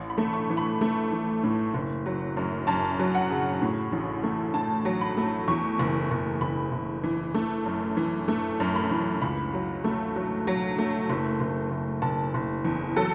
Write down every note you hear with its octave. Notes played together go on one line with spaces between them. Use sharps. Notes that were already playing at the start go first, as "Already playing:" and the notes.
Already playing: A1
B5
A3
C#6
E3
B5
A3
E3
A2
F#1
F#3
F#2
F#2 A5
F#3
F#5
C#3
A2
A1
A3
A2 A5
F#3
B5
A3
E2 C#6
F#1
F#1
F#1 B5
F#1
E3
A3
F#2
E3
A3
F#2
B5
E3
C#2 B5
F#3
A3
F#3
F#3
A3
F#1
F#1
F#1
F#1 A5
F#1
E2
F#3 A4